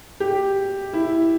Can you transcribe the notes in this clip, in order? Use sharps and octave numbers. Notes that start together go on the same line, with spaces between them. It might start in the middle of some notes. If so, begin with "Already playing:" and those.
G4
E4